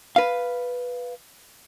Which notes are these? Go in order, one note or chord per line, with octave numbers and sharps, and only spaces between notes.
B4 F5